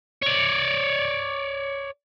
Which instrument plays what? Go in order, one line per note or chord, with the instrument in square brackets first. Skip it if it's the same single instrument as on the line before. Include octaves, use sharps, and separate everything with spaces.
[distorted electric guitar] C#5 D5